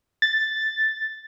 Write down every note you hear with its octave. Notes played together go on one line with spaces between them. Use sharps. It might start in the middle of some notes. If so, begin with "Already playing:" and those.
A6